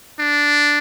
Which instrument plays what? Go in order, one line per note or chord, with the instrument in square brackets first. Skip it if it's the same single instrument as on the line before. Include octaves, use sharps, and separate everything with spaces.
[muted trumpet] D4